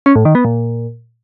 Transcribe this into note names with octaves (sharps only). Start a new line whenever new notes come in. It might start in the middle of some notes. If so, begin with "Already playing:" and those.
C#4
A2
D#3
B3
A#2